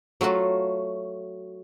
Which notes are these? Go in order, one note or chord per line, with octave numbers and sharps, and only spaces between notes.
F#3 A3 F4 F#4